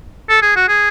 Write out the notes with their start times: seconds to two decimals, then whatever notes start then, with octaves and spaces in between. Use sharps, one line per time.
0.29 A4
0.42 G#4
0.56 F#4
0.68 G#4